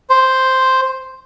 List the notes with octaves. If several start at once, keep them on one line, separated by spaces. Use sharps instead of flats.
C5